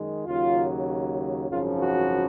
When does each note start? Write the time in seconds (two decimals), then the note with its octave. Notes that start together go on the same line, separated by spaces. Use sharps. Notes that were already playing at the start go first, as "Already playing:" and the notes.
Already playing: F#2 D#3 G#3
0.27 D#2 C#3 F#3 F4
1.49 G#1 F#2 C#3 F3 F4
1.80 F#4